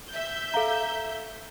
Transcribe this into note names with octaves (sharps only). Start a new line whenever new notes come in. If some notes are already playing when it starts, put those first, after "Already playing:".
E5 G6
A4 F5 A#5